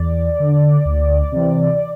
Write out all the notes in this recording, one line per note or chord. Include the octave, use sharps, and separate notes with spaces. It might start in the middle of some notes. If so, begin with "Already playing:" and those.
Already playing: E2 D5
D3
D2
C3 E3